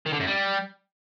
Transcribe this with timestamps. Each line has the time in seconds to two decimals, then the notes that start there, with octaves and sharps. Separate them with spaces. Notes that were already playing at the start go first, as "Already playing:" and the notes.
0.06 D#3
0.13 D3
0.20 F#2
0.27 G3